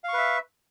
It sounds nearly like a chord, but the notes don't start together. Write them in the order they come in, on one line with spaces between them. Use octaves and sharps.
F5 C#6 B4 E5